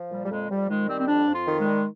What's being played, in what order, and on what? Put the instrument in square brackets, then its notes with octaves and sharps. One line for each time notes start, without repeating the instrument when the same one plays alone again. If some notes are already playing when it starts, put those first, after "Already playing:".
Already playing: [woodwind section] F3
A#2 G3
G3
F2 G#3
F2 G3
D#3 G#3
G3 C4
C4
F2 D4
F2
F4
D#3
G#3
G3